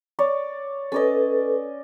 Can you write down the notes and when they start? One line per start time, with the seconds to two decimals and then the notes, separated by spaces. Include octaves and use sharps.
0.19 C#5 D5
0.92 C#4 A4 B4 D5 D#5